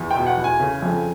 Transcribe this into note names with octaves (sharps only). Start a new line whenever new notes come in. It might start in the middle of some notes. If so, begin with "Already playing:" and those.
Already playing: E2
B2 G5
F#5
E2
G#5
C#3
F2